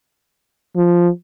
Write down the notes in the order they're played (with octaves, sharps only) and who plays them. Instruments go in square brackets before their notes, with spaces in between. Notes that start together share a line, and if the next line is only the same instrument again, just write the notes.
[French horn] F3